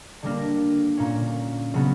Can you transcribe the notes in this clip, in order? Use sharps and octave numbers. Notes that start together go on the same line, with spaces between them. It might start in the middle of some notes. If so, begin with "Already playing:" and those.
D3 G3 A#3 D4 A#4
A#2 A#3 C#4
C#3 F#3 B3